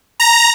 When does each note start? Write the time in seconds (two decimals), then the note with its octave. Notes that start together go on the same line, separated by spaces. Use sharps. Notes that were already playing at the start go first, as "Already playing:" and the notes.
0.20 A#5